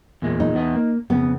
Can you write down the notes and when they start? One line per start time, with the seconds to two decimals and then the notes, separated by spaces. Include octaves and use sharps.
0.22 E2 A#2 G#3
0.40 D#4
0.54 E2 B3 D#5
0.75 A#3
1.10 F2 C#3 B3